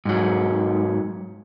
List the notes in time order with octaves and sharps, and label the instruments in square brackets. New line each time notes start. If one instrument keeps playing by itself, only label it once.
[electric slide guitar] G#2 F#3